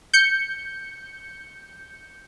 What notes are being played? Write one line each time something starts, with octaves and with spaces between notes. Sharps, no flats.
G6 C#7